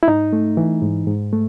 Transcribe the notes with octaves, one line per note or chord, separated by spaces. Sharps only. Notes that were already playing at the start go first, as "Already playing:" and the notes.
E4
G#2 D#4
A3
E3
G#2
G#2
A3